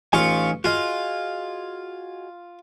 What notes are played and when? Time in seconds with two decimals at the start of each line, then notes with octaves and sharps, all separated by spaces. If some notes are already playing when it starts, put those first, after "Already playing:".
0.13 A1 D#4 F4 G#5 C#6
0.64 F4 F#4 G#4 D#5